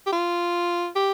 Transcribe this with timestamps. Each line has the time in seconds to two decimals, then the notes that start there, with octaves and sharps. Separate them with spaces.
0.06 G4
0.12 F4
0.95 G4